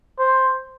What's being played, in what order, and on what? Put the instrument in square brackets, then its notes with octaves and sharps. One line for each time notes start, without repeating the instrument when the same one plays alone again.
[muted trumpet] C5